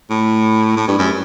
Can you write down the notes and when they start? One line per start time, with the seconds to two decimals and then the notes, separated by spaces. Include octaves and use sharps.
0.10 A2
0.77 A2
0.88 G2
0.99 F#2